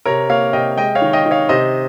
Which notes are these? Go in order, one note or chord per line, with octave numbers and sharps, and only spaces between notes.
C3 A#4 C#5
A#3 C#5 F5
C3 D#5 G5
G#3 D#5 G5
C#5 F5
D#3
D#5 G5
D#3
C#5 F5
C3 C5 D#5